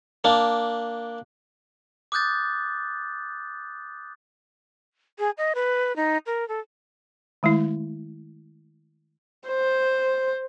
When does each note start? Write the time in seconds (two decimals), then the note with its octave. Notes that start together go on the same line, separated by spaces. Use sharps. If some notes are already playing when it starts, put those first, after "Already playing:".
0.24 A#3 D4
2.12 D6 D#6 F#6 G6 A6
5.19 G#4
5.38 D#5
5.55 B4
5.96 D#4
6.26 A#4
6.48 A4
7.43 D#3 G#3 A3 E4
9.48 C5